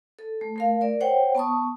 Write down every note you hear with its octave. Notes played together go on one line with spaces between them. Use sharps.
A4
A3
A3 A#4 F5
A#4 D5
C5 C#5 F#5 G5
B3 A5 C#6 D#6